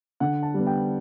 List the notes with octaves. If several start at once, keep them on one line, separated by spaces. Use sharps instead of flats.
D3 F#5
A5
G3 B3
G5